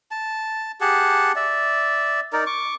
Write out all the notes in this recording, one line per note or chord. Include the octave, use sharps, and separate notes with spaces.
A5
G4 G#4 F#5 A5
D5 E5
D#4 A#4 D5
C#6 D6